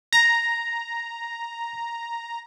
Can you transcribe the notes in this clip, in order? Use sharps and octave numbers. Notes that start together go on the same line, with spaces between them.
A#5 A#6